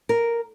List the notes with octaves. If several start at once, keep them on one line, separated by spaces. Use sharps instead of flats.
A#4